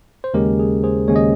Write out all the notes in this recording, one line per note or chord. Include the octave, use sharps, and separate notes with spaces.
C5
D#2 C#3 G#3 C#4 G4 A#4
G#4
G#4 C5
D#2 C#3 G#3 C#4 C#5
D#5